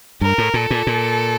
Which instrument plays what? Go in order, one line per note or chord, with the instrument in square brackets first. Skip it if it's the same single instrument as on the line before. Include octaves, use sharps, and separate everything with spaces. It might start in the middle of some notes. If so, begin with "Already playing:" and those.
[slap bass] G2 [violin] A#4
[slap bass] A2
[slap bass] A#2 [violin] A4
[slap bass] A#2
A#2